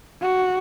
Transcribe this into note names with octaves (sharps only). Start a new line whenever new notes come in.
F#4